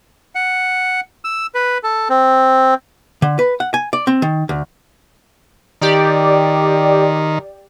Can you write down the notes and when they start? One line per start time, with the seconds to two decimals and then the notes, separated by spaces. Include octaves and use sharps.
0.35 F#5
1.25 E6
1.55 B4
1.83 A4
2.10 C4
3.22 D3
3.39 B4
3.60 F#5
3.74 G#5
3.93 D5
4.07 C4
4.22 D#3
4.49 D2
5.81 D#3 G4 D5